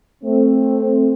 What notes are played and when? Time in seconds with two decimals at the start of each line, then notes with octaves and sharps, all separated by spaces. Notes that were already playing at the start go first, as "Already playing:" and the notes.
0.24 A3 C4